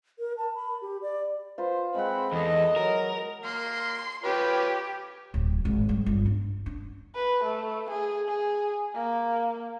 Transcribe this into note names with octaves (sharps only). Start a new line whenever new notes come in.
A#4
A5
B5
G4
D5
F4 B4 C5
G#3 C4 F#5 B5
E2 A4 D#5
F#3 A#4
A#3 C6
F4 G4 B4 C#5
D1
G#1
G3
G1
D4
D4
B4
A3
G#4
G#4
A#3